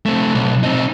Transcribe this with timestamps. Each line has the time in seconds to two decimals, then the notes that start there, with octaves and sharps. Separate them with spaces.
0.06 A3 C4
0.35 B1
0.63 C4 D#4